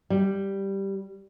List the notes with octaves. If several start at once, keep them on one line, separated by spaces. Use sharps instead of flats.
G3